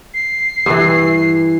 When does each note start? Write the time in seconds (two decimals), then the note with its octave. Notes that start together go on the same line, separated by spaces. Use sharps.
0.14 C7
0.66 G2 E3